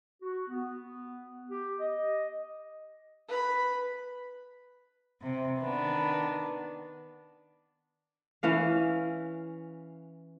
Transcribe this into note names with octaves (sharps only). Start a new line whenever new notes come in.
F#4
B3
G4
D#5
B4 B5
C3
D#3 B3 D4
E3 C#4 F5